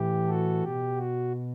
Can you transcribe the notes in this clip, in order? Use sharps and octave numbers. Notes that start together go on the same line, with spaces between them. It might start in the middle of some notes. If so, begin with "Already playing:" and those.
Already playing: A2 E3 G4
F#4 A4
B2 G4
F#4